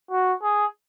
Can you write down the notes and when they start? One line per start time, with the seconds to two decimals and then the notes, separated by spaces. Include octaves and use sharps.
0.11 F#4
0.43 G#4